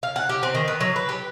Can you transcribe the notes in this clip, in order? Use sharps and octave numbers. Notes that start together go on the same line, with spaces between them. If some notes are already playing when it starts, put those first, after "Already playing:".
F5
F#5
G4
C4
D#3
B3
F#3
B4
G4